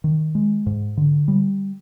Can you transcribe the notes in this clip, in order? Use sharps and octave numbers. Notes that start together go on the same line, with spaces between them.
D#3
G#3
G#2
D3
G3